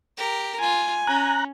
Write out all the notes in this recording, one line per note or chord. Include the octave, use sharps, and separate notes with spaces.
G4 A#4
F4 G#5
C#4 A#5 F#6